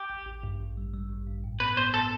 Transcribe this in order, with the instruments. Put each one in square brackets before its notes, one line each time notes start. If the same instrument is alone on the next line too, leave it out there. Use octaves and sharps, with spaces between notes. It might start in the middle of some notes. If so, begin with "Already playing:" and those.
Already playing: [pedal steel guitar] G4
[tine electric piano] A1
A1
G2
A1
G3
G3
A1
G2
A2
[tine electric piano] B3 [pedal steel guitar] B4
[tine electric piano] B3 [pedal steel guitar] C5
[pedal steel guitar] A4